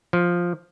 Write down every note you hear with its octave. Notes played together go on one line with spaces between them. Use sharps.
F3